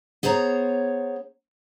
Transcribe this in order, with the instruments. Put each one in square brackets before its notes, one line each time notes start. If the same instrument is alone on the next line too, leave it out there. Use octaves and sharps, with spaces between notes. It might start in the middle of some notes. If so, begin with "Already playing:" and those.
[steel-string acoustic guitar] B3 G#4 C5 C#5 A#5